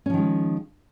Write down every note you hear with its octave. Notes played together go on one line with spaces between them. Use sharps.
D#3 F3 G#3 C#4